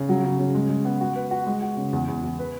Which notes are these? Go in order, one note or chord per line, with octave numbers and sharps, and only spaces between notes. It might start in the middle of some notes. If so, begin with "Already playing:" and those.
Already playing: C#3
F#3
C#3
C#3
G#3
G#3
B3
F#4
B4
F#4
G#3
F#4
C#3
E2
E2
E2
B4